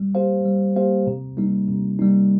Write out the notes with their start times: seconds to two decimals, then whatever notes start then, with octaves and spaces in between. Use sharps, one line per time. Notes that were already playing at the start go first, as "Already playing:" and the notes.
Already playing: G3
0.15 A#3 G4 C5 F5
0.45 G3
0.76 A#3 G4 C5 F5
1.07 C3
1.37 G3 A#3 D#4
1.69 C3
1.99 G3 A#3 D#4